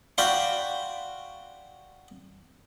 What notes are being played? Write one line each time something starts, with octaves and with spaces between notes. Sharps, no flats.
F#4 D5 F5 G5 B5 C6